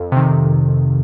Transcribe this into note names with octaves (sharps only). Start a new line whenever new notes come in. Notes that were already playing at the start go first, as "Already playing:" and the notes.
Already playing: F2 A4
C3 D#3